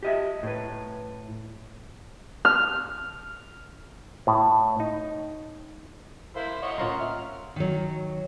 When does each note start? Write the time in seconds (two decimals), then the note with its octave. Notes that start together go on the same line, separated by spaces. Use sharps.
0.03 G4 D#5 E5
0.43 A2 B4
2.45 F6
4.27 A2
4.80 D#4
6.36 E4 A#4 C5 E5 F5
6.62 C#5 D#5 F#5
6.78 A2 A#3 C#4 F4 A#5 C6
7.00 E5 F#5 F6
7.56 D#3 F#3